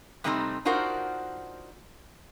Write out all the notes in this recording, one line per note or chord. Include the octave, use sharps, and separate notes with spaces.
C3 G3 A3 C4 D#4 A#5
D4 D#4 F4 F#4 A#4 C5